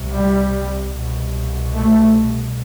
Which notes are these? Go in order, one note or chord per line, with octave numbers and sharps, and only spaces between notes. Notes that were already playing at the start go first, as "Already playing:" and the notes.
Already playing: C2 C3
G3
C2 B2
A3